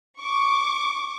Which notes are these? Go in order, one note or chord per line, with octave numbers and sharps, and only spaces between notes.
C#6 D6